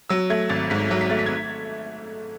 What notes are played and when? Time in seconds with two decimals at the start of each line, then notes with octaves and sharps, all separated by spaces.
0.09 F#3 E6
0.30 A3 G#6
0.49 G#1 A6
0.70 G#2 B6
0.91 F#3
1.01 B6
1.10 A3 A6
1.19 B6
1.26 G#6